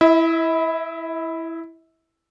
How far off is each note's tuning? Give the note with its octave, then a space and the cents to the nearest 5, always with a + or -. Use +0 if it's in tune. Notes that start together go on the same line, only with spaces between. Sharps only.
E4 +0 E5 -40